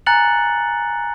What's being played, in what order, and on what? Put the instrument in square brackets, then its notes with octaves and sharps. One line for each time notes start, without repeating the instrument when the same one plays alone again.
[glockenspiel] G#5 A#5 F#6 A6 C#7 F#7